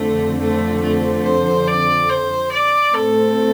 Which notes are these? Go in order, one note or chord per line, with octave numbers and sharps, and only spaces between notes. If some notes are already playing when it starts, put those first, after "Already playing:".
Already playing: F2 D3 F3 A3 C4 A4
A3
A3
C5
D5
C5
D5
A2 A3 C4 A4